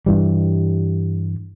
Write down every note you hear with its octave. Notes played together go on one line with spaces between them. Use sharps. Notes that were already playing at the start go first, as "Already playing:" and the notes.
G2 E3 G3